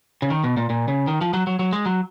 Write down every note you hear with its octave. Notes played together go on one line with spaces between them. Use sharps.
C#3
D#3
B2
A#2
A#2
C#3
D#3
F3
F#3
F#3
F#3
G#3
F#3